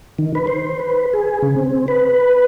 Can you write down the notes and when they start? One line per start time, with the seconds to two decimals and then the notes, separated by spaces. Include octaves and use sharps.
0.19 D#3
0.35 B4
0.47 C5
0.80 B4
1.13 G#4
1.42 C#3
1.56 C4
1.88 B4